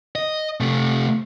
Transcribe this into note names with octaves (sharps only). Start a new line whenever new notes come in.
D#5
C3 A3